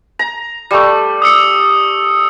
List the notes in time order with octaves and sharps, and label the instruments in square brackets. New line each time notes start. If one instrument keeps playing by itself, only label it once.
[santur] A#5
G3 A3
[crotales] D#6 E6 C#7